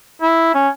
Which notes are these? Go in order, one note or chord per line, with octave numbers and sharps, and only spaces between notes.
E4
C#4